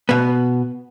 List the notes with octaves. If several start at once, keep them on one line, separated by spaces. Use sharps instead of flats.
B2 B3